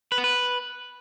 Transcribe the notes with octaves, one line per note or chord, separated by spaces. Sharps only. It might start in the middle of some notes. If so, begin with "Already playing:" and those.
B4
B3
B4